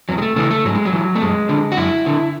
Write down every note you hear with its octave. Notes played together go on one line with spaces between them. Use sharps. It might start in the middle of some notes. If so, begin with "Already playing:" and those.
E2 F#3
G#3
A3
C#3 E3 A3
A3
G#2 F#3
G#3
F#3
E3
A3
F#2 G#3
D3
F#4
F#2 E4
D3